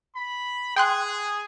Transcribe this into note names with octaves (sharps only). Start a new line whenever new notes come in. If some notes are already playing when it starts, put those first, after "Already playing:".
B5
G#4 G5 C6 F#6